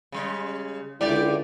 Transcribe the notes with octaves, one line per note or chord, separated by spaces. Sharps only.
C#3 G3 G#3
C#2 D3 G#3 E4 G4 D5